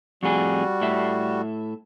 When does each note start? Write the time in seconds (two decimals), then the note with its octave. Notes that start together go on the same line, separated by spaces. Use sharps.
0.23 F2 A2 G3 F#4 G#4
0.81 A2 E5